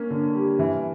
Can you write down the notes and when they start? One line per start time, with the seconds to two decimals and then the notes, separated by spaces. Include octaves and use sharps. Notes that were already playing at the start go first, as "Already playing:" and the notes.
Already playing: A#3 C#4
0.10 D3
0.35 G3
0.59 E3